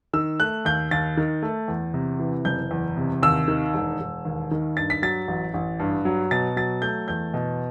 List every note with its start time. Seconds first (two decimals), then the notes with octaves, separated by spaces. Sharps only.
0.13 D#3 E6
0.40 A3 F#6
0.65 D#2 G6
0.91 D#2 A6
1.17 D#3
1.42 A3
1.68 E2
1.94 C3
2.19 E3
2.45 F#1 G6
2.71 E2
2.97 C3
3.23 D#2 E6
3.48 D#3
3.74 E1
4.00 E1
4.25 D#2
4.51 D#3
4.77 G2 A6
4.90 B6
5.02 F#3 A6
5.28 A1
5.54 A1
5.79 G2
6.05 F#3
6.31 B2 A6
6.56 F#3 A6
6.82 A3 G6
7.08 E2 G6
7.34 B2